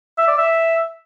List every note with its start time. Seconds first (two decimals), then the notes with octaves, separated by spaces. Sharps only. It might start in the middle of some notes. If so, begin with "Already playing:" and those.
0.18 E5
0.28 D5
0.38 E5